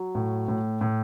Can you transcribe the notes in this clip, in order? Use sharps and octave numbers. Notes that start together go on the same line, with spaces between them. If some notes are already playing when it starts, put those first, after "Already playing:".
Already playing: F#3
A2
A2
A2